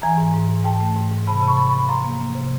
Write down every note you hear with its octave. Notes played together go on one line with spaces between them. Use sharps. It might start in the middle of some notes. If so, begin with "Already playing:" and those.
E3 G#5 A#5
G#2
G#2
G#2
G#2 G5 A5
A3
G#2
G#2
C3 A5 B5
C3
B5 C#6
F3
F3 B5 C#6
F3 A#5 C6
A#3
A#3
C3